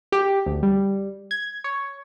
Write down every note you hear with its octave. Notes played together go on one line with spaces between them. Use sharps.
G4
D2
G3
G#6
C#5